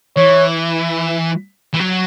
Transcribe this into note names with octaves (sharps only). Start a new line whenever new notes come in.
E3 C#5
E3
F#3